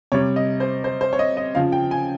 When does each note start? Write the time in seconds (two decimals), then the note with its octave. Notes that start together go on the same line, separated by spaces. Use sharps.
0.12 C3 G3 C#5
0.36 D#5
0.60 C5
0.84 C5
1.01 C5
1.13 C#5
1.19 D#5
1.37 D#5
1.55 C#3 F3 F5
1.72 G5
1.91 G#5